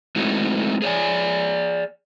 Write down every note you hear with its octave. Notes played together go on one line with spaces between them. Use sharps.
G#3 A3 C4 D#4 E4 F#4
G#4 C#5 D5 G#5